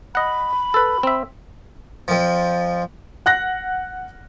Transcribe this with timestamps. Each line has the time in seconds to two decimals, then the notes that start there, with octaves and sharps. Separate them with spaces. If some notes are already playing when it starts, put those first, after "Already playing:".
0.15 D#5 F#5 B5
0.74 A4 B4
1.03 C4 E5
2.08 F2 F3
3.26 F#5 F#6 A#6